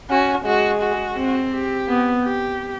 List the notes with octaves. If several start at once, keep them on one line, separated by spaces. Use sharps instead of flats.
C#4 F#4
G#3 F#4
F#4
C4
G4
B3
G4